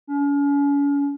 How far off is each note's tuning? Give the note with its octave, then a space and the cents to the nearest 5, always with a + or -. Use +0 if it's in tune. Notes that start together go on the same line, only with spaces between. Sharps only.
C#4 +40